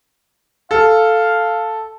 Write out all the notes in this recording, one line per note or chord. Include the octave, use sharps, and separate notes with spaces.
A4 F5